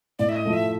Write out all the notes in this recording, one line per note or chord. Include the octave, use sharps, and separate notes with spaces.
A2 D5
E5
D#5
F3 A3
E5